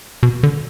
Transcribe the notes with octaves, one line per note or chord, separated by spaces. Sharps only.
B2
D3